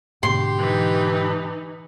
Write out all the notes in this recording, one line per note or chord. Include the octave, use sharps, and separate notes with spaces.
G#2 B2 D3 G4 C6
E3 D#4